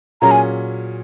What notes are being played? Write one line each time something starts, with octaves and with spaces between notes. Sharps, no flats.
A#2 F#3 C#4 G#4 A#5
G#5